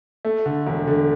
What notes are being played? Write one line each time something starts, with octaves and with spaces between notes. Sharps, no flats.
A3
D3
E1
D3